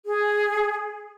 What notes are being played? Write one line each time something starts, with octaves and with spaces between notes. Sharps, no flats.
G#4